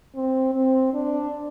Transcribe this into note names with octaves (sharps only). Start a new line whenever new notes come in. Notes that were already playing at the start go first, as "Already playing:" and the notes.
C4
C4
D4